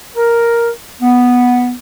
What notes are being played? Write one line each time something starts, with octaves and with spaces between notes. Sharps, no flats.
A#4
B3